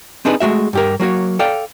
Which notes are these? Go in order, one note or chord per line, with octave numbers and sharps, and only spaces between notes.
C4 D4 D#4 G#4 B4
G#3 A3 F#4 E5
G2 G4 A#4
F#3 A#3 F#4 C#5
A4 D5 F5 G5